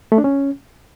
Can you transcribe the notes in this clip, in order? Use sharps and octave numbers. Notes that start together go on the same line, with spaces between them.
A3
D4
C#4